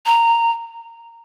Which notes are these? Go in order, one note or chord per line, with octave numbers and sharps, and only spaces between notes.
A#5